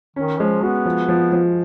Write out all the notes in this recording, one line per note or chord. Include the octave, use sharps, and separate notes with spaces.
D#3 C#4
F3 G#3
B3 F#4
F3
F3
F3